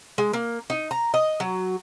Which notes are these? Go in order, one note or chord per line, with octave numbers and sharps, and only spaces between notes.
G#3
A#3
D#4
A#5
D#5
F#3